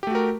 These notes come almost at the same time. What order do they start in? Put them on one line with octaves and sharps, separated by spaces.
G4 A3 F#4 A#4